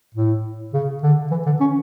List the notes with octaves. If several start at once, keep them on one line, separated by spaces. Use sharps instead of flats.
A2
C#3
D3
E3
D3
C#4